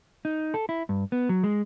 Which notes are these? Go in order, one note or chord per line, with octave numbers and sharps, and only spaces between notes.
D#4
A4
E4
G2
B3
F#3
G#3